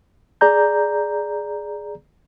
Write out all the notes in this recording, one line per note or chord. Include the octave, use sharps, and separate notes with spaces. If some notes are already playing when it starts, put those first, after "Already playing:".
G#4 D5 A#5 G6